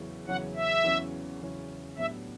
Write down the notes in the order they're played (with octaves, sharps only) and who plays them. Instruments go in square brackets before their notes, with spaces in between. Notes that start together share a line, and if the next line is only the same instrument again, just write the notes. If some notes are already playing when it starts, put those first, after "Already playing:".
Already playing: [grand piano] E2 C#3 F#3 C#4 E4
[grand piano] E2 C#3 F#3 C#4 E4 [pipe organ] F#5
[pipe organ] E5
[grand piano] E2 C#3 F#3 C#4 E4
E2 C#3 F#3 C#4 E4
[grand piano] A2 F#3 B3 D4 G4 [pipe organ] E5